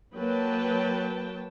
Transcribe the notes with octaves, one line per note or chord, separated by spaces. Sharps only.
F#3 A#3 B4 G5 A5